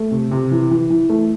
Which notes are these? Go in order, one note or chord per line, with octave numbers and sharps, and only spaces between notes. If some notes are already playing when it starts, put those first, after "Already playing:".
Already playing: A3
C3
C3
E3
E3
E3
A3